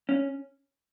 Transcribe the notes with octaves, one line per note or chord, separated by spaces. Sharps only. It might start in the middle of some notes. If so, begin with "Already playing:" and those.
C#4